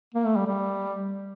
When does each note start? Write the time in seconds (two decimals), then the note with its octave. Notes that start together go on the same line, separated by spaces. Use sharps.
0.14 A#3
0.26 A3
0.36 G3
0.47 G3